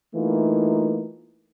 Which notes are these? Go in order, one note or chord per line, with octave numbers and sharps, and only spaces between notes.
E3 A3 A#3 D#4 F4